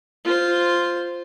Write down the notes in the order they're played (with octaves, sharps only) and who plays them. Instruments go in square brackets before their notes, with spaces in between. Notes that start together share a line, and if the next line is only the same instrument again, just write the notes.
[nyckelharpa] F4 C5